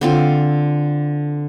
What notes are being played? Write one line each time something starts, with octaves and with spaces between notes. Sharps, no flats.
D3 C4 F4